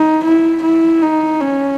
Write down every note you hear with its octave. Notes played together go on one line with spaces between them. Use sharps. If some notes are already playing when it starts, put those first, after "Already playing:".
Already playing: D#4
E4
E4
D#4
C#4